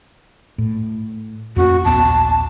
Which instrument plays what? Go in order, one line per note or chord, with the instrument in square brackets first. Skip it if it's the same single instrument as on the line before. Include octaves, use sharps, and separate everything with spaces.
[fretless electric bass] A2
[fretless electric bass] F2 A#3 C#4 [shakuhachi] F#4
[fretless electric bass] A#1 D#2 B3 [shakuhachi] A5